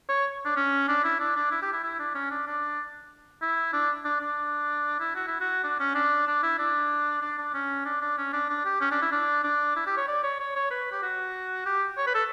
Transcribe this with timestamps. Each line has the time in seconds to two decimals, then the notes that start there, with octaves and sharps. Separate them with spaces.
0.09 C#5
0.45 D4
0.56 C#4
0.88 D4
1.04 E4
1.20 D4
1.36 D4
1.51 E4
1.62 G4
1.73 E4
1.83 E4
1.99 D4
2.15 C#4
2.31 D4
2.47 D4
3.42 E4
3.73 D4
4.05 D4
4.21 D4
5.00 E4
5.16 F#4
5.28 E4
5.41 F#4
5.64 D4
5.80 C#4
5.95 D4
6.27 D4
6.43 E4
6.59 D4
7.22 D4
7.38 D4
7.54 C#4
7.85 D4
8.02 D4
8.18 C#4
8.33 D4
8.49 D4
8.65 G4
8.81 C#4
8.91 D4
9.02 E4
9.12 D4
9.44 D4
9.76 E4
9.87 G4
9.97 C#5
10.08 D5
10.23 C#5
10.40 C#5
10.56 C#5
10.71 B4
10.92 G4
11.03 F#4
11.66 G4
11.98 C#5
12.07 B4
12.15 A4